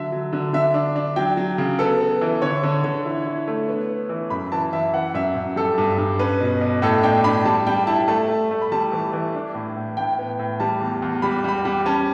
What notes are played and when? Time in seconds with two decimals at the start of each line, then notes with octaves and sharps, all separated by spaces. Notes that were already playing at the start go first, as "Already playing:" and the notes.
Already playing: D3 F#3 E5
0.12 F#3
0.33 D3
0.53 D3 E5
0.74 D4
0.96 D4
1.16 F#3 G5
1.37 F#3
1.58 C#3
1.79 B3 A4
2.00 B3
2.21 E3
2.42 D3 C#5
2.63 D3
2.84 D3
3.06 E4
3.26 E4
3.48 A3
3.69 B3
3.89 B3
4.09 E3
4.30 F#2 B5
4.52 E3 A5
4.73 E3 E5
4.93 E3 F#5
5.14 F#2 E5
5.35 F#2
5.56 G3 A4
5.78 G2
5.98 G2
6.19 C#4 B4
6.40 B2
6.61 B2
6.82 A2 A4
7.03 D4 G5
7.24 D4 B5
7.45 G3 A5
7.67 G3 G5
7.87 E4 A5
8.08 A3 A5
8.29 A3
8.51 A3
8.62 B5
8.72 G3 A5
8.92 E3
9.13 E3
9.35 D4
9.55 A2
9.77 A2
9.97 A2 G5
10.19 B3
10.39 A2
10.60 G3 A5
10.80 E2
11.02 E2
11.22 G3 B5
11.44 G3 B5
11.65 G3
11.86 C#4 A5